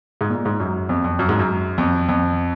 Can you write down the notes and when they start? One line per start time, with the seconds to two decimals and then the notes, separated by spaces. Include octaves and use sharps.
0.21 G#2
0.30 A#2
0.45 G#2
0.60 F#2
0.89 F2
1.04 F2
1.19 F#2
1.29 G#2
1.39 F#2
1.78 F2
2.09 F2